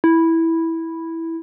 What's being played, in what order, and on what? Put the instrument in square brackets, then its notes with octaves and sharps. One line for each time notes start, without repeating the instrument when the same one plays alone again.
[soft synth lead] E4